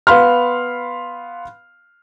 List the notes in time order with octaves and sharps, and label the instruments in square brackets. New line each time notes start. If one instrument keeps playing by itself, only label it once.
[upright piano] B3 F5 B5 C6 F6